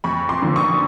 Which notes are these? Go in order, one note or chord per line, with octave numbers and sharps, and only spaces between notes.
F2 B5 C#6
C6 D6
D3 F3 A#3
C#6 D#6